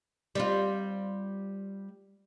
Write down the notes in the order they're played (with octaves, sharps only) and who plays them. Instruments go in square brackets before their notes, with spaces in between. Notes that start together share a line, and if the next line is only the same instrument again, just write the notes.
[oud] G3 C4 F4